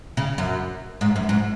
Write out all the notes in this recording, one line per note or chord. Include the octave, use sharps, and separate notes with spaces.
C#3
F#2
G#2
F#2
G#2